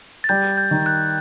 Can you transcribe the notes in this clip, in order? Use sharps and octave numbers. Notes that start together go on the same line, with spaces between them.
A6
G3 G6
G6
D#3
F#6